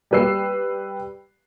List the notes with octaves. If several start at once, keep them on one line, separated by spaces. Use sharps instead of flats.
G3 G4 B4 E6 C7